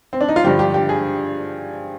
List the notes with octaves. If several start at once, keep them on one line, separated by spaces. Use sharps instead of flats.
C4
D4
D#4
F4
G2 D3 F3 G4
G4
G4
G#4